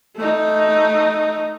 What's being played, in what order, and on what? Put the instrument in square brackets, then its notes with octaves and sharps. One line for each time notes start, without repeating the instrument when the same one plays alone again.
[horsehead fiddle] A3 D#4